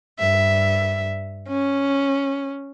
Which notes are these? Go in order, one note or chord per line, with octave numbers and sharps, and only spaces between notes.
G2 E5
C#4